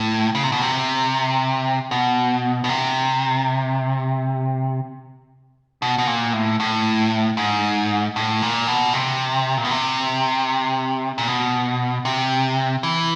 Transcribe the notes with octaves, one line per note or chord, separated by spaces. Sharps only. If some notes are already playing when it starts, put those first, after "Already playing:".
Already playing: A2
C#3
C3
B2
C3
B2
B2
C3
B2
B2
A#2
A2
A2
G#2
A2
A#2
B2
C3
A#2
B2
C3
A#2
B2
C3
E3